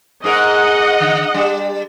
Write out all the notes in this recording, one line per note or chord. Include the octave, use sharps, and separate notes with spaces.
G#2 G#4 A#4 D#5 F#5
D3
G3 D4